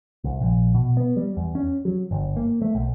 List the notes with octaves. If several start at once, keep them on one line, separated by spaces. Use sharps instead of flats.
C2
A#1
B2
B3
G3
E2
C#4
F#3
G1
A#3
A3
B1